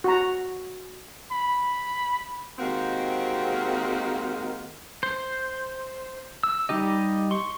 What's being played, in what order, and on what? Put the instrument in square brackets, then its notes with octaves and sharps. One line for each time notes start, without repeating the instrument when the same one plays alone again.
[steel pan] F#4 A#5
[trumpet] B5
[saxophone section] C3 D#3 G#3 A#3 C4 F#4
[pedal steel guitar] C5
E6
G3 D#4 G4 D#5
C6 C#6